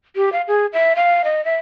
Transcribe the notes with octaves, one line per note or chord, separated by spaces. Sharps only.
G4
F5
G#4
E5
F5
D#5
E5